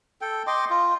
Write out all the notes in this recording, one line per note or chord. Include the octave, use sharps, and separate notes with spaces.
A4 G5
D#5 G5 C6 D6
F4